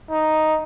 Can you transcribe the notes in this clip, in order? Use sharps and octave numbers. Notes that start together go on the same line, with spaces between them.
D#4